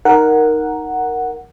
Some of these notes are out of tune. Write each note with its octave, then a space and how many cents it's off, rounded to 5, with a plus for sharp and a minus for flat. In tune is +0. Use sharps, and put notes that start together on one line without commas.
D#4 +0 A#4 +0 F#5 +0